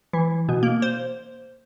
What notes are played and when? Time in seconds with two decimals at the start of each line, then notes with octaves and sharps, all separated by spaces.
0.13 E3
0.49 B2
0.63 A#3
0.82 C5